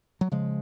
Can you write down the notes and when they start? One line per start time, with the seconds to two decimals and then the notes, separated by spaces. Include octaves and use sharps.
0.21 F#3
0.32 C#3 F3 G#3